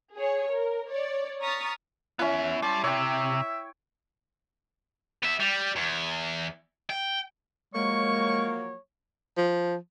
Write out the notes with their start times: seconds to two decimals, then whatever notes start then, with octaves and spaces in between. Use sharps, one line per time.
0.15 G#4 C#5
0.50 A#4
0.89 C#5 D5
1.41 A#5 C#6 D#6 F6 A6 B6
2.19 B3 C#4 E4 E5
2.62 G3 A5 C6
2.84 C3 C#5 E5 G5
5.23 B3 E5
5.40 G3
5.76 E2
6.90 G5
7.74 F3 F#3 G#3 A#3 C#5 C#6
9.37 F3